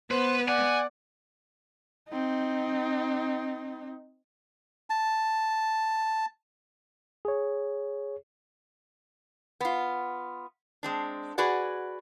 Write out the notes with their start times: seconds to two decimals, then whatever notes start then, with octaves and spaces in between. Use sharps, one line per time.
0.11 B3 B4 C5
0.48 D5 F#5 G#5
2.09 C4 D#4
4.90 A5
7.25 G#4 C#5
9.60 B3 F4
10.83 G#3 C4 D4
11.38 F#4 G#4 B4 D5 F#5